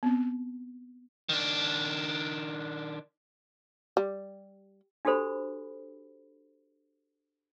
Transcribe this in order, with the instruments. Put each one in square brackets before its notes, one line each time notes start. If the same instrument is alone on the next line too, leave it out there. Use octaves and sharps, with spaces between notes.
[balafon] B3 C4
[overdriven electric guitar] D#3 D4
[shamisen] G3
[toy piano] D4 F#4 G4 A4 C5 B5